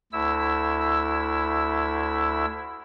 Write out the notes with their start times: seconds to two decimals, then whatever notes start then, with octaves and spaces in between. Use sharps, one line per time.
0.12 D2 E4 E6